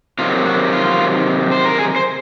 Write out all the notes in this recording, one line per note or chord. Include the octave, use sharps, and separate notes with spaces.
C3 D#3 F#3 F4
F#4
F4
C5
A#4
G#4
C5